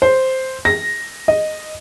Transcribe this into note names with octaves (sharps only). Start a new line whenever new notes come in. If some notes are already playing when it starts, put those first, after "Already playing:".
C5
A#6
D#5